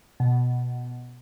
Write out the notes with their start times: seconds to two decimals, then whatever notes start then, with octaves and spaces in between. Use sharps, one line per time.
0.20 B2